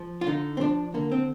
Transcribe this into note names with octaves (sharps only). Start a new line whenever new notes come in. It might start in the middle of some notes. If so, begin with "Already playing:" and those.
Already playing: F3
F4
D3 D#4
C4
F3 D4
D3 A#3
C4